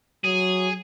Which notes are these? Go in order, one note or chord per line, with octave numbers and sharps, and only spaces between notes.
F#3 G#4